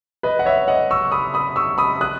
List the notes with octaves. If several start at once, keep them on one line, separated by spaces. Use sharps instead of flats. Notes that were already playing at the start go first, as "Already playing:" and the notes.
B4 D#5
F#5
C#5 E5
D#5 F#5
C#6 E6
B5 D#6
B5 D#6
C#6 E6
B5 D#6
D#6 F#6